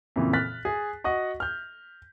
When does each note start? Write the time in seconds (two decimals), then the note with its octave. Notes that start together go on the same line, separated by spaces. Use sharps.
0.16 F2 A#2 C#3 E3
0.33 F6 F#6 A6 B6
0.65 G#4
1.04 F#4 D#5 F#5 C#6
1.40 F6 G6